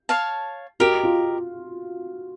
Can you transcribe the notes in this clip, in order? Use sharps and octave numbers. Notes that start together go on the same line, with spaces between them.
C#5 F5 A5
F#4 G4 A#4 D#5
F4